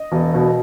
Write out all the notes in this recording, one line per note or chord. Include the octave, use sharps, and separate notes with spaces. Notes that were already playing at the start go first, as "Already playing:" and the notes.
Already playing: D#5
E1
B2